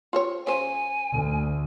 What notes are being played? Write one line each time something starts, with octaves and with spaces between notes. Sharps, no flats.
F4 C5 C#5
C#3 C5 G#5
D2